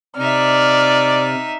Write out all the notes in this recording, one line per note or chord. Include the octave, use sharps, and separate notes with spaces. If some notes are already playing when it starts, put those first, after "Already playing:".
C3 D#4 D5 E5 F6